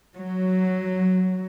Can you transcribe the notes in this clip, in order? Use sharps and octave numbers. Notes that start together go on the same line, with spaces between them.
F#3